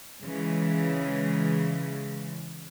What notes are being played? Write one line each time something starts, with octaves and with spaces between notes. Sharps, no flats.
C#3 E3 G#3